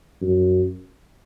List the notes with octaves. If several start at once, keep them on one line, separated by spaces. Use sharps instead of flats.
F#2